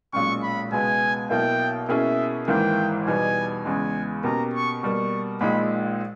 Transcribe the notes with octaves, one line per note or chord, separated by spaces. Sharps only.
B1 A#2 G#3 C#4 C#6
B5
C#2 B2 G#3 B3 G#5
B1 B2 A#3 E4 G5
B2 A#3 C#4 E4 G#4 E5
G#1 G#2 E3 A#3 G5
E2 B2 G3 B3 D#4 G#5
E2 C#3 G#3 G#5
B2 A#3 C#4 G4 A#5
C#6
B2 G3 A#3 C#6
A#1 A#2 G#3 D#4 B5